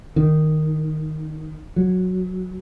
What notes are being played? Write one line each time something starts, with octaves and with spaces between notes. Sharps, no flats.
D#3
F#3